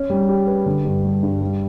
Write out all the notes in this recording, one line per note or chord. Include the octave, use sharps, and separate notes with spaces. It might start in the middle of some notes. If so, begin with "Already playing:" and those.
Already playing: C#4
G3
G4
B4
D3
G2
G3
G2
G3